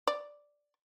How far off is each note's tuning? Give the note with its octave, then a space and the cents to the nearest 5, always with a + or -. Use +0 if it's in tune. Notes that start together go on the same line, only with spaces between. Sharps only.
D5 +0